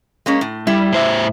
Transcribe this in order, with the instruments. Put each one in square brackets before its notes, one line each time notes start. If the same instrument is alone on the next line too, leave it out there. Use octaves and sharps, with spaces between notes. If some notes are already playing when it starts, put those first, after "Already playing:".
[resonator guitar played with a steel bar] G#3 A#3 C#4
A2
[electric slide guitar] G3 [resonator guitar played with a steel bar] E4
[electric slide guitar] A2 C5 E5